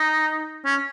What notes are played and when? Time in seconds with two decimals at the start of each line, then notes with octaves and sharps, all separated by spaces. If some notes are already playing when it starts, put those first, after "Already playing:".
Already playing: D#4
0.65 C#4